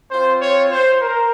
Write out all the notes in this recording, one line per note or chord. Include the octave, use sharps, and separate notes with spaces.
C4 F4 C5
C#5
C5
A#4